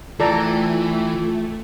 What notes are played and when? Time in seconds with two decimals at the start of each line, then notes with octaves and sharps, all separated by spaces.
0.20 E3 A3 F4 A4 D5 G5 A#5